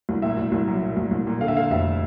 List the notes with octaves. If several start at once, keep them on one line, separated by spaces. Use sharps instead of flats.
C2
A#2 E5
C2
C2
F#3
A#2
C2
C2
A#2
D3 F5
E5
D3 F5
F1 E5